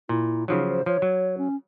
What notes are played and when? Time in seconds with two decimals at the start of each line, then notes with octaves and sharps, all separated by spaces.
0.09 A#2 E4
0.48 C#3 F3 F#3 D#4
0.69 C5
0.86 F3 C#5
1.02 F#3
1.38 C#4